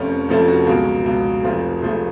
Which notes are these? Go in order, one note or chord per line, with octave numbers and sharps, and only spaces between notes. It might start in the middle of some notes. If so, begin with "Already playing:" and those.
Already playing: F1 F2 F3 A3 C#4 C#5
F1 F2 F3 A3 C#4 A4
F#4
C#2 B2 F#3 G#4
C#2 B2 F#3
F1 F2 F3 A3
F1 F2 F3 A3 G#4